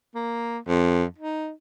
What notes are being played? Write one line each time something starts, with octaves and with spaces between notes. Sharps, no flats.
A#3
F2
D#4